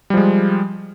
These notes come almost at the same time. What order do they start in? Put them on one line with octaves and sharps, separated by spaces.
G3 F3 G#3